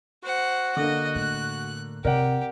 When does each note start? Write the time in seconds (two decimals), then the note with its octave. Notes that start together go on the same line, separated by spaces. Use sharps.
0.23 F#4 C5 F#5
0.77 D3 A#3 D#5
1.15 A2 F#6
2.05 C3 G4 A#4 D5 F#5